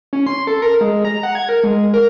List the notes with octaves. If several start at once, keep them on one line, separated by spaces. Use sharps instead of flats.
C#4
C6
A4
A#4
G#3
A#5
F#5
G#6
A#4
G#3
A#4